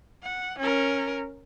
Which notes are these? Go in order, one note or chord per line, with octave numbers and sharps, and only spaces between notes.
F#5
C#4 A#4